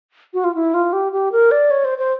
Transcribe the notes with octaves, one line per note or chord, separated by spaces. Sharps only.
F#4
F4
E4
F4
G4
G4
A#4
D5
C#5
C5
C5